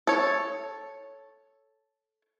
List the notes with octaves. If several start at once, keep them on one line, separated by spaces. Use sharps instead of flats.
A4 C#5